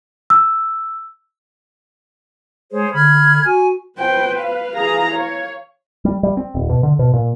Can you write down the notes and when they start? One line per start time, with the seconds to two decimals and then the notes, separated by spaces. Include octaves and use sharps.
0.30 E6
2.72 G#3 G#4 C5 C#5
2.94 D3 B5 F6 G#6
3.45 F#4 G#5
3.99 B4 C5 G5
4.42 F5
4.76 E3 G#4 A#5
5.14 C#5
6.05 G3
6.23 G3
6.37 C4
6.55 D#1
6.69 B2
6.83 D3
6.99 B2
7.13 A#2